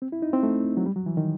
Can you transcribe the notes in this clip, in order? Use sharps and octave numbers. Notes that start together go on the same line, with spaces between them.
C4
E4
D#4
C4
A3
F#3
G3
F#3
E3
D#3